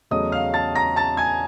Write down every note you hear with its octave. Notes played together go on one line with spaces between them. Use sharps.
E2 C#3 F#3 A3 D#5 D#6
F5 F6
A5 A6
A#5 A#6
A5 A6
G#5 G#6